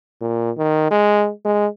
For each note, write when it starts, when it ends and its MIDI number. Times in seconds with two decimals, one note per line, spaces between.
0.21 0.51 46
0.57 0.89 51
0.91 1.30 56
1.45 1.67 56